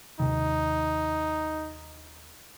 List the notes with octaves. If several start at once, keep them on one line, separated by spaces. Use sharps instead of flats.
D#2 C3 D#3 D#4